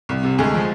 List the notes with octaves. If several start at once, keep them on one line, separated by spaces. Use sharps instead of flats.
C2
C3
D2 G#3 G#4
F3